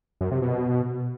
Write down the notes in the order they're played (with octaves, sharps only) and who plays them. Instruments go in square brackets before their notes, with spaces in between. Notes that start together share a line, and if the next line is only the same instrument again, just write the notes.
[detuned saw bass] F#2
C3
B2